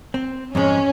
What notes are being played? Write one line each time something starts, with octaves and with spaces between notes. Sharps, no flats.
C4
F2 G#2 G#3 C#4